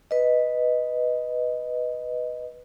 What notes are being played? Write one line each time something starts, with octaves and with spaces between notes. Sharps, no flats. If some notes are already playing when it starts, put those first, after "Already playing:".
B4 D#5